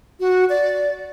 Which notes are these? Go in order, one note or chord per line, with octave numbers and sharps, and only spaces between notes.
F#4
D5